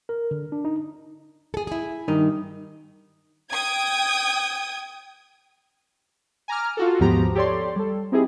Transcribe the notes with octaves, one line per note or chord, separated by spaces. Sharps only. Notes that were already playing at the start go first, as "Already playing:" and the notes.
A#4
D3
D4
D#4
G#4 A4
E4 G#4
G2 D#3 D#4
G5 D#6 G#6
G#5 A#5 D6 F6
F4 F#4 A4
D#2 G#2 F3 B3 G4 A#5
G4 A4 C#5 D5 C6
G3 A4
C4 D#4 E4 G4 G#4